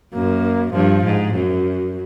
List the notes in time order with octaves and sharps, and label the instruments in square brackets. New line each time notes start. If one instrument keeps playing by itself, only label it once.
[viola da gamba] F#2 [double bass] A#3
[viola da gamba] G2 [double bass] F3
[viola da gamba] G#2
F#2